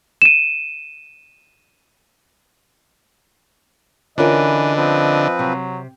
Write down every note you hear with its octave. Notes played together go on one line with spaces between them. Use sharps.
D#7 E7
D3 E3 C#4 F4 A#4 B4 D#5
F3 C4 B4
C3 F#3